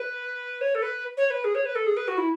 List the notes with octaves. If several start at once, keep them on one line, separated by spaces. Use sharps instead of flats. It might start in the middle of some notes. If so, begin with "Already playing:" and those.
Already playing: B4
C#5
A4
B4
C#5
B4
G#4
C#5
B4
A4
G#4
B4
F#4
E4